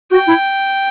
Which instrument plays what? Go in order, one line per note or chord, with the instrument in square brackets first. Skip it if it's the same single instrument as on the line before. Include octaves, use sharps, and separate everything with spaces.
[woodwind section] F#4 [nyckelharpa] G5
[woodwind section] E4